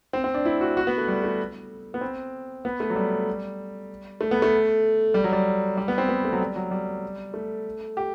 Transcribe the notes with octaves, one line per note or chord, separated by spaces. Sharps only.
C4
C4
D4
E4
F#4
F#4
B3
A3
G3
A3
B3
C4
B3
A3
F#3
G3
A3
B3
A3
G3
F#3
G3
G3
B3
C4
B3
A3
F#3
G3
F#3
G3
A3
G4